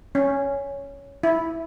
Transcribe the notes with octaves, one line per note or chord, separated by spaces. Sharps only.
C#4
E4